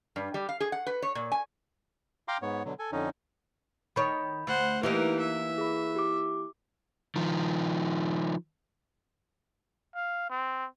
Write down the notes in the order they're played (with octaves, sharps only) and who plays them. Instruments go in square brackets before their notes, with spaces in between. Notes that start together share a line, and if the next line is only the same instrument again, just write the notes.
[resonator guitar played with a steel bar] G2
G3
F5
G#4
F#5
B4
C#5
A#2
G#5
[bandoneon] F5 G5 A#5 C6 D6
G#2 B3 C#5
B2 D3 F#3
A4 G#5
F2 D3 C#4 D#4
[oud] D#3 C#5 [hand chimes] B5 G6
[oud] D2 [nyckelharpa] C5 F#5
[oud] E3 A#3 D#4 [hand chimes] E4 [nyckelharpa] G4 A#4
[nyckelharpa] E5
[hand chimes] G#4 B5
G4 D6
[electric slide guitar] D#3 F3
[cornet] F5
C4